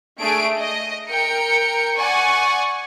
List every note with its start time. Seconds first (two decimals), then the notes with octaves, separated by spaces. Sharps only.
0.20 A3 D4 G#4 D7
0.59 D#5
1.08 A#4 G5 C#7
1.97 D5 F#5 G#5 C#6